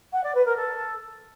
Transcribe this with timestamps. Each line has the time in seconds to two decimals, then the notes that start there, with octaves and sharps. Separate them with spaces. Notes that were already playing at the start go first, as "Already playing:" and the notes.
0.12 F#5
0.23 D5
0.34 B4
0.45 A#4
0.56 A4